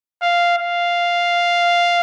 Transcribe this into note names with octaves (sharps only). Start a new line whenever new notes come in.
F5
F5